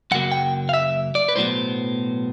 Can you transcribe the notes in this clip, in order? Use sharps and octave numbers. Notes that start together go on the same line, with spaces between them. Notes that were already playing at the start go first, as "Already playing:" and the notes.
F#2 C#3 F#3 A#3 F#5
G5
F5
E5
D5
B4
B1 A2 F#3 B3 C5